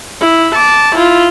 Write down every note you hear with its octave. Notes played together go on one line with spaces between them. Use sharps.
E4
A5 D6
E4 F4